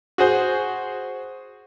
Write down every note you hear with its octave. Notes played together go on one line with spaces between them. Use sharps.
F#4 G#4 C5